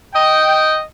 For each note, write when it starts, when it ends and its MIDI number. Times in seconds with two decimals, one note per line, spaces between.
0.14 0.81 75
0.14 0.81 79